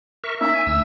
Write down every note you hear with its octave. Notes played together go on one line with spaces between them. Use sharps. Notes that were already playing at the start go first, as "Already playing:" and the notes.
A#4 E5 C#6
A#3 C#4 D#4 E5
G#5
D2 E6